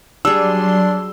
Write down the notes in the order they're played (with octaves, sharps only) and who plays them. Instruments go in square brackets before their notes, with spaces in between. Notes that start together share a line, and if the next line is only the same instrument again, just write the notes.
[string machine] F#3 C6 [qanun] G3 G#4 [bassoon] D4 [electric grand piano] E6